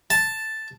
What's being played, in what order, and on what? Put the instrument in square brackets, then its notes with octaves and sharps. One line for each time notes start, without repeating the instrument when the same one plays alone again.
[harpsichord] A5